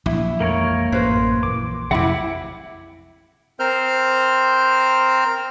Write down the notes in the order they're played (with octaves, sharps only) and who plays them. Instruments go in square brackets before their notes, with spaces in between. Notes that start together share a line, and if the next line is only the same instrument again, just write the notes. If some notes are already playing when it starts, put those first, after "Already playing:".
[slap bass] A#1 [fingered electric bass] F#3 [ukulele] E4
[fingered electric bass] F2 E3 G#3 [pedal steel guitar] A#3 A#4 C#5
[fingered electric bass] A1 [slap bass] F#2 [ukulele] B4 C5
[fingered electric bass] A#1 E3 [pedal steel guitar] D6
[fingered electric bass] F2 F#3 [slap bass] C3 [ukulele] E4 E5 [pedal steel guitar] F#5 B5 D6
[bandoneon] C4 A#4 C5 F6 G6